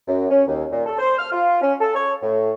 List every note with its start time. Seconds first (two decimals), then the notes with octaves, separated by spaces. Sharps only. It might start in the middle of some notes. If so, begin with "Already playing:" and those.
0.07 F#2
0.30 C#4
0.47 D#2
0.71 A#2
0.86 A4
0.99 C5
1.19 F6
1.31 F4
1.62 C#4
1.80 A4
1.95 C#5
2.22 A2